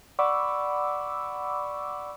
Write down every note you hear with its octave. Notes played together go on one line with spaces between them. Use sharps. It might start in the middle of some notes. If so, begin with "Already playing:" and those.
D5 F#5 B5 C#6 D6 E6